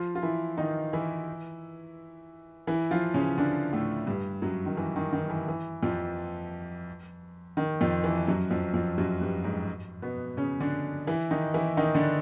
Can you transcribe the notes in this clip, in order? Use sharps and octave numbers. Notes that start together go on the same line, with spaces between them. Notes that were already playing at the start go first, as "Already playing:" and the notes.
Already playing: F3 F4
F4
E3 E4
D#3 D#4
E3 E4
E3 E4
F3 F4
C#3 C#4
D3 D4
A2 A3
G2 G3
F#2 F#3
D#3
E3
D#3
D#3
E3
E3
F2 F3
D#3
F2 F3
E3
F#2 F#3
F2 F3
F2 F3
F#2 F#3
G2 G3
G#2 G#3
B2 B3
C#3 C#4
D3 D4
E3 E4
D#3 D#4
E3 E4
D#3 D#4
D3 D4